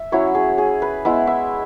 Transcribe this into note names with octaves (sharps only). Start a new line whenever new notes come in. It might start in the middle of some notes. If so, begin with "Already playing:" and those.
Already playing: E5
F#3 C#4 E4 C#5
G#4
G#4
B4
G#3 B3 E4 E5
E5